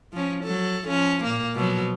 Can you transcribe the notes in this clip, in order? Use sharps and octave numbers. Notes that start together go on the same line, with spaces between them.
F3 C#4
F#3 A4
F3 C#4
A#2 A#3
B2 F3 F#3